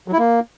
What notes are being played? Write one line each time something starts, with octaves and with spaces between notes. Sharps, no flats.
F#3
E4
A#3